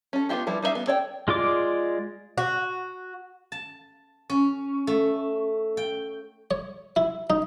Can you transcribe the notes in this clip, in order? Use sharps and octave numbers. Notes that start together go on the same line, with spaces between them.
C#4 A4
B3 D4 E4 F4 G4
F3 G3 E4 B4
G3 D#4 C5 E5 F5
B3
A4 C#5 D5 G5
G#3 F4 D5 D6
F#4
A5
C#4
A3
G5
C#5
E4
D#4